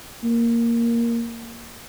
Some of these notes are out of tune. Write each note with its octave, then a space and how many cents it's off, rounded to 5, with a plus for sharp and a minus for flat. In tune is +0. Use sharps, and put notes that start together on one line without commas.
A#3 +0